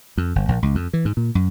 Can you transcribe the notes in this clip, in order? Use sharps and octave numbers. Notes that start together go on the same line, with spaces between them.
F2
G1
A#1
C#2
F2
E3
G#2
A#2
F#2